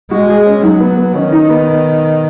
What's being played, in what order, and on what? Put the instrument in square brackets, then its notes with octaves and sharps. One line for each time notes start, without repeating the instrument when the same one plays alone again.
[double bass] G#3 [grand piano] F#4
[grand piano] G#4
C#4
[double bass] F#3 [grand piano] D#4
[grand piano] B3
B3
[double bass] D#3 [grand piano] C#4
[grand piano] D#4
B3